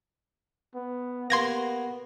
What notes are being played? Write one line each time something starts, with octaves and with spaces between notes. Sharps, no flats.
B3
A#3 B3 F#4 G4 C6 G#6 A#6